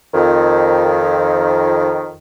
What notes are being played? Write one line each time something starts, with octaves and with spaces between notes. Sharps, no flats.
F2 D#3